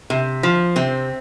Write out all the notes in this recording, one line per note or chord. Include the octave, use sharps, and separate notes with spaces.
C3
F3
C3 C4